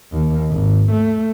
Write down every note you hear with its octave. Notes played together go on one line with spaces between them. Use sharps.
D#2
G#1
A3